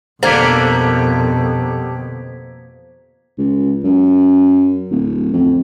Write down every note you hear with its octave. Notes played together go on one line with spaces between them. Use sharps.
F2 B2 D3 G3 A#3 C5 G#6 B6
C#2
F#2
D1
F2